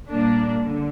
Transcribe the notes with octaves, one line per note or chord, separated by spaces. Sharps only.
A#2 G3 A#3 D4
D3